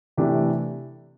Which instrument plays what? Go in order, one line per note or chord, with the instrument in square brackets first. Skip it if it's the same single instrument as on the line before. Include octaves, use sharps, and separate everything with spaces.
[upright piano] C3 E3 A3 D4 G4